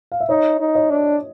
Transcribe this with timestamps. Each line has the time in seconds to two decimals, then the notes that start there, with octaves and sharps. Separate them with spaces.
0.12 F5
0.21 E5
0.29 D#4 C#5 D#5
0.60 D#4
0.75 C#5 D#5
0.90 D4